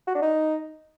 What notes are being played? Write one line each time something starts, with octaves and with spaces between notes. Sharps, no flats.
F#4
D4
D#4